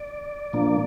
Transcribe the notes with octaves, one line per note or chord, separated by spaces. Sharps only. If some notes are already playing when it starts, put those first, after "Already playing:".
Already playing: D5
A#2 F3 A#3 D4